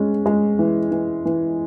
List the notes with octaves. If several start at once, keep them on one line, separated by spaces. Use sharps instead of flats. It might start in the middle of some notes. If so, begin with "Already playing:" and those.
Already playing: G#3 C#4
G#3
E3
E3
E3